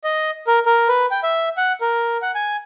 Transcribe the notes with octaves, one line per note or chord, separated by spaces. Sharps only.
D#5
A#4
A#4
B4
G5
E5
F#5
A#4
F#5
G#5